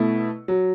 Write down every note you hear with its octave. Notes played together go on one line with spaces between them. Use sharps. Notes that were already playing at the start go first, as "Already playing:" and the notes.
Already playing: B2 A3 E4
F#3